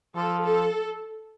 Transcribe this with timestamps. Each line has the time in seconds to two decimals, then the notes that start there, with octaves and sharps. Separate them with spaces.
0.15 F3 A4
0.44 A4